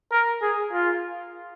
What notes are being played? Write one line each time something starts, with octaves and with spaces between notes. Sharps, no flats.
A#4
G#4
F4